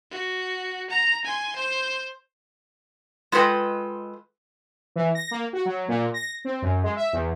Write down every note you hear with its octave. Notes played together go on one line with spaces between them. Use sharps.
F#4
A#5
G#5 C6
C5
G#3 F4 A4 B4 D#5 G5
E3
A#6
A#3
F#4
F#3
A#2
A#6
C4
F#2
G#3
E5
E2